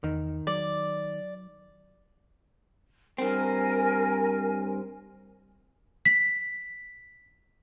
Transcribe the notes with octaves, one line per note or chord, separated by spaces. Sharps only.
E2 D#3
F#3 D5
G2 C4 A#4 G#5
B6